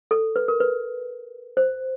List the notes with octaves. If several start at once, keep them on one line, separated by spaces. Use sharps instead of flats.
A4
B4
A#4
B4
C5